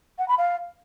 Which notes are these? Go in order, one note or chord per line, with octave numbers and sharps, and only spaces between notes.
F#5
B5
F5